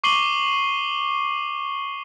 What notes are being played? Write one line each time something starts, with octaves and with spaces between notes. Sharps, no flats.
C#6 D6 C7 D#7 F#7 G7